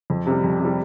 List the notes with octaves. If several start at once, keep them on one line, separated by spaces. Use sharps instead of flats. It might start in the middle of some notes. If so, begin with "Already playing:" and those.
F2
C3 G3
F2
C3
G3